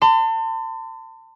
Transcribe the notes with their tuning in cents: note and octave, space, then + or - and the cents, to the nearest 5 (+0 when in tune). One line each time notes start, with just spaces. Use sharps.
A5 +35 C6 -35